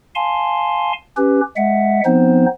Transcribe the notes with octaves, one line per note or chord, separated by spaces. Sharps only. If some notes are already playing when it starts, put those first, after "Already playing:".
F5 G#5 A5 C6
C#4 G4 B4
G#3 E5 F#5
F3 B3 C4 D#4 C5